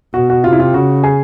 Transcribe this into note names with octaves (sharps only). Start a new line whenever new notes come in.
B2 F#4
F#4
C3 F4
E4
F4
C#3 F#4
G#4